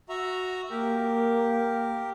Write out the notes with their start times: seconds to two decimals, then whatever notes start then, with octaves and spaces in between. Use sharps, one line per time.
0.09 F#4 E5 A#5
0.70 A#3 G4 A#4